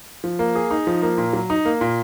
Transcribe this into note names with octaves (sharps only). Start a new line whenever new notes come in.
F3
A#3
G#4
D#4
F3
A#3
A#2
F#3
D#4
A#3
A#2